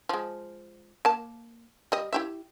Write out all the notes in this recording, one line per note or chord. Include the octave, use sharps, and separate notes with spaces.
F3 G#3
A#3 A5
G3 D#5
E4 G4 E5